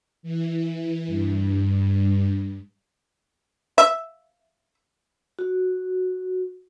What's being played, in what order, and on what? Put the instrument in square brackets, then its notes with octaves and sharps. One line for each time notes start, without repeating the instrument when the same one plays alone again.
[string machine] E3
G2
[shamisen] E5
[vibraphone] F#4